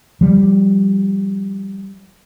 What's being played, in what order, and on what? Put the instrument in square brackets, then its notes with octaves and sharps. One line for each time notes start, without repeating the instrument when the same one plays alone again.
[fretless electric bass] F3 G3